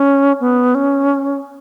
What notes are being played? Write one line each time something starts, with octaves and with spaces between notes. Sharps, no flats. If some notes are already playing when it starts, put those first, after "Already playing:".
Already playing: C#4
B3
C#4